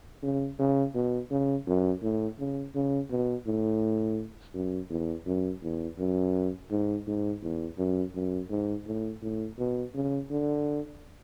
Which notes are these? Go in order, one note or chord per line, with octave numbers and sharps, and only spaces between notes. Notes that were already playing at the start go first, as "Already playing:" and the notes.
C#3
C#3
B2
C#3
F#2
A2
C#3
C#3
B2
A2
F#2
E2
F#2
E2
F#2
G#2
G#2
E2
F#2
F#2
G#2
A2
A2
B2
C#3
D3